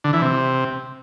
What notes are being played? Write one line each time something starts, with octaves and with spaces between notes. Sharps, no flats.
D3
E3
C3